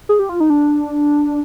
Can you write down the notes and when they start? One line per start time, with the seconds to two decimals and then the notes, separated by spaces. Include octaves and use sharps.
0.09 G#4
0.19 G4
0.29 F4
0.40 D#4
0.50 D4